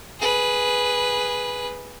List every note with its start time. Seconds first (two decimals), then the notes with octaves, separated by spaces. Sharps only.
0.20 G#4 B4